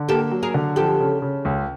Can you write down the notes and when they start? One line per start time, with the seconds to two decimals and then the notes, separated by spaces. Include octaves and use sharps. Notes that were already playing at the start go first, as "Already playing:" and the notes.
Already playing: D3
0.09 A#3 G4 A4
0.31 F#3
0.43 G#4 A#4
0.54 D3
0.76 F3 G4 A4
1.00 C#3
1.22 C#3
1.45 C#2